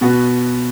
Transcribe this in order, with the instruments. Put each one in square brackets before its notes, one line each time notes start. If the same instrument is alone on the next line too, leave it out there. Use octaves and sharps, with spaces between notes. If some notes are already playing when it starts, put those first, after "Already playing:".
[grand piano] B2 B3 F#4